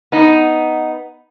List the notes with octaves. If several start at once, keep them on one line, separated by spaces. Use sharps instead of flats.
B3 D#4